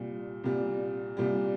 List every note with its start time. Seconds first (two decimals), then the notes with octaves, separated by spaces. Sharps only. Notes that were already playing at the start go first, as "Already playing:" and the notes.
Already playing: C2 A#2 G3
0.44 C2 A#2 G3
1.17 C2 A#2 G3